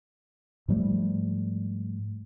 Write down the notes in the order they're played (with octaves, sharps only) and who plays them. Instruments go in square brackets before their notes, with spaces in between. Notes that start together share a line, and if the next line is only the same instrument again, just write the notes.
[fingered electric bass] G#2 F3 G3 A3